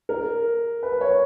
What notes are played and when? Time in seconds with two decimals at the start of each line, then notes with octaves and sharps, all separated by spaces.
0.09 A#4
0.83 B4
1.01 C#5